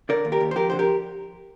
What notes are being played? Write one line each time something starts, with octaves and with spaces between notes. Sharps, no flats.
D3 A#4 D5
D#2
G4 A#4
D#2
C5
F2 G4 A#4
D3 C5
G4 A#4